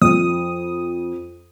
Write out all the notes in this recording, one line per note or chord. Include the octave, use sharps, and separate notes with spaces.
F2 D#6